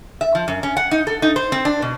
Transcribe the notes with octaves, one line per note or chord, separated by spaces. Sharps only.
E5
F3
F#2
C#4
F#5
D#4
A4
D#4
C5
C4
D4
B2